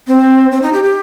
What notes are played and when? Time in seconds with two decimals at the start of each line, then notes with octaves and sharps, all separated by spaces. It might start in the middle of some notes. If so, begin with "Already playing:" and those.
0.08 C4
0.52 C4
0.62 D#4
0.73 G4
0.83 G4